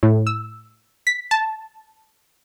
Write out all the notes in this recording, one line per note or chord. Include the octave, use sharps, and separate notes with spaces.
A2
E6
B6
A5